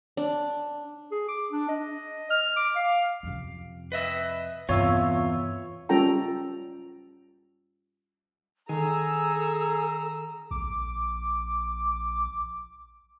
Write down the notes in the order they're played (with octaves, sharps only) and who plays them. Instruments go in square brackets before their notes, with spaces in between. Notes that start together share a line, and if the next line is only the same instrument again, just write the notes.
[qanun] D4
[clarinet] G#4
D6
D4
D#5
F6
D6
F5
[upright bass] F2 C3
[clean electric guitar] B4 D#5 E5
[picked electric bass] E2 [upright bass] G2 [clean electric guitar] C3 F4 [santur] C#5 E5
[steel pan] G3 C#4 F4 A4 G5 A#5
[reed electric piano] D#3 [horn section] G#4 [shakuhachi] A4 [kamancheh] A#5 E6
[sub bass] A#1 [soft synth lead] D6